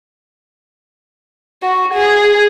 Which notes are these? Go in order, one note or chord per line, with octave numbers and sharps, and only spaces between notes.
F#4
G#4